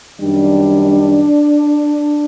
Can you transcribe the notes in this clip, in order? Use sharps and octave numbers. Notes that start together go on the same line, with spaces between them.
F#2 D#3 G3 D4